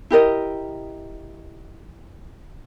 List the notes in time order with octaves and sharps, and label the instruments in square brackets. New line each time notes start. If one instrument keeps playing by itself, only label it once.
[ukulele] E4 G4 A#4 D#5